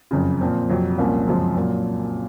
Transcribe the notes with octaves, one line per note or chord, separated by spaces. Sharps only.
F#1 F2 C#3
A#2 F3 C4
F2 C3 F#3
C2 A#2 F3 A#3 C#4
F#2 C#3 F3 G#3 C4
A#2 F#3